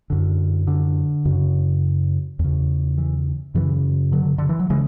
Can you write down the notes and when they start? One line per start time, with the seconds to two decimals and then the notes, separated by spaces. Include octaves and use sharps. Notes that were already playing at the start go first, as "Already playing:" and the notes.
0.10 F#2 D3
0.67 D3
1.25 F#2 C#3
2.39 E2 C#3
2.98 E3
3.54 F#2 C#3 E3
4.12 D3 F#3
4.38 D3
4.49 E3
4.59 F#3
4.70 C#3 E3 G#3